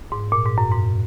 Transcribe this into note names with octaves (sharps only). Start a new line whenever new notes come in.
G#2
A#2
G#2
F#2
G#2